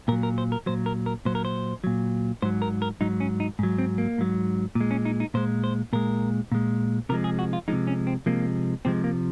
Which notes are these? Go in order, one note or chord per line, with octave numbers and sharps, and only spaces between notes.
A#2 F#3 A#4
A#4
C5
A#4
A#2 F#3 C5
A#4
A#4
A#2 F#3 C5
A#4
C5
A#2 F#3
G#2 F#3 C5
A#4
A#4
G#2 F#3 D#4
C#4
D#4
G#2 F#3
C4
A#3
G#2 F#3
A#2
G#3
C#4
D#4
D#4
A#2 G#3 C5
C5
A#2 G#3 A#4
A#2 G#3
C3 F3 G#3 A#4
G#4
F#4
F4
C3 F3 G#3 D#4
C#4
C4
C3 F3 G#3 A#3
C3 F3 G#3 C4
A#3